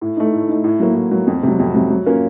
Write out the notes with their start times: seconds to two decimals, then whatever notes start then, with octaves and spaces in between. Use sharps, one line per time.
0.01 A2
0.17 A3 D#4
0.33 A2
0.49 A3 D#4
0.64 A2
0.80 F#3 A#3
0.95 A2
1.11 F#3 A#3
1.27 F2
1.43 C3
1.48 F#3
1.59 F2
1.74 C3 F#3
1.90 F#3
2.06 A#3 C#4 F4 A#4